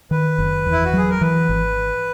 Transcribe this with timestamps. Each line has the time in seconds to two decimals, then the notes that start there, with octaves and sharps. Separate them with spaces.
0.11 D#3 B4
0.38 F#1
0.67 E2
0.72 E4
0.85 F#4
0.93 F#3 G#4
1.10 A#4
1.21 E3 B4
1.49 G#1